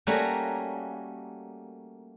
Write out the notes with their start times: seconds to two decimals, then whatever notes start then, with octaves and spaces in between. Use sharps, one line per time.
0.07 G3 A3 A#3 C#4 F#4 C#5